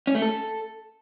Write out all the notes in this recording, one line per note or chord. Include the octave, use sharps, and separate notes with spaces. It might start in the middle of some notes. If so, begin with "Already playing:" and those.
C#4
A3
A4